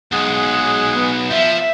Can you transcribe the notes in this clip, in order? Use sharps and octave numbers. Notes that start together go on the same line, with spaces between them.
B1 G#3 G#4 F#5
B3
F3 E5